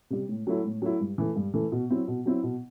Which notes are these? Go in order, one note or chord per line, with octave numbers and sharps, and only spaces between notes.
C3 G3
A2
F#3 A3 E4
A2
F#3 A3 E4
G2
E3 A3
G2
E3 A3
B2
F#3 C4 E4
B2
F#3 C4 E4
B2